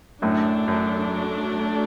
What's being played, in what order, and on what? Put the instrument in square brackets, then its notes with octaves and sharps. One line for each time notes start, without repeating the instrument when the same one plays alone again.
[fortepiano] F#2 A2 [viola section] F#3 A3 D4
[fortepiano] F#2